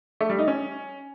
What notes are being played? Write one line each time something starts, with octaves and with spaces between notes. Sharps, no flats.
A3
G3
D#4
C#4